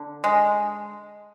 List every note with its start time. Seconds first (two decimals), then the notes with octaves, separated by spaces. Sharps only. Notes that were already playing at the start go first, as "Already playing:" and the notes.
Already playing: D3
0.24 G#3